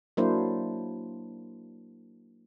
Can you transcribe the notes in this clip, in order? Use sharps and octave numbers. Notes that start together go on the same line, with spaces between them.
F#3 A#3 D4 E4 C5